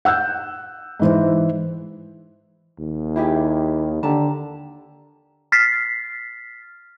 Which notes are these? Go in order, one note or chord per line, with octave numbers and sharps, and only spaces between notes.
F#5 E6 F#6 G6
G#2 E3 C5
D#2
E4 G4 G#4
D3 G4 A5 A#5
F6 A6 B6 C7